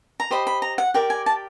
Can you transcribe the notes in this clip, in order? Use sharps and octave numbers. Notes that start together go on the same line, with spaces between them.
A#5
G4 C5 D#5 B5
B5
A#5
F#5
G4 A#4 D5 G5
G#5
A5